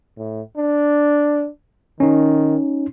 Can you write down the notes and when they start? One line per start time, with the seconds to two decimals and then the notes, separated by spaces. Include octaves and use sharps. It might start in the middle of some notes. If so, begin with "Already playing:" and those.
0.18 A2
0.57 D4
2.00 D#3 C#4 D#4